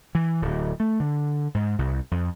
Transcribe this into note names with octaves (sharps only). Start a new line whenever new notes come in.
E3
D1
A3
D3
G#2
C2
F2